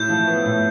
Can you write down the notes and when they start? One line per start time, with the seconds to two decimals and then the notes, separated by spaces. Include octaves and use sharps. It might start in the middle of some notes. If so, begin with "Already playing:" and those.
Already playing: A2 E4 G6
0.09 F3
0.27 B3
0.45 A2